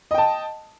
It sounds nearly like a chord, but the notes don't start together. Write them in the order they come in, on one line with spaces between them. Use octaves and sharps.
D#5 G5 A5